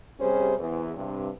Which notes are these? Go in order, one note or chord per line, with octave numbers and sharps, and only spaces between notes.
C3 G3 C#4 G#4 C5
E2
G2 C3